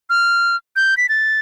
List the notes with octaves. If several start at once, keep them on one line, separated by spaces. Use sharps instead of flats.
F6
G6
B6
A6